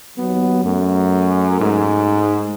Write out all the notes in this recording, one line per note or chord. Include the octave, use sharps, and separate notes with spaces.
D#2 F#3 B3
F#2 A3
G#2